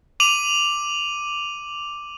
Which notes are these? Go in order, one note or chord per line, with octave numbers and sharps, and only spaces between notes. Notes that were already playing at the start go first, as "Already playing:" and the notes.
D6 D#7 F7 F#7